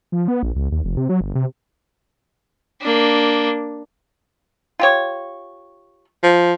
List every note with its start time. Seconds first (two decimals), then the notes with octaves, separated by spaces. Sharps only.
0.12 F3
0.28 B3
0.43 A#1
0.55 C#2
0.72 D#2
0.84 F1
0.97 C3
1.09 F#3
1.21 G1
1.35 C3
2.81 A#3 D4
4.80 F4 G4 C#5
6.23 F3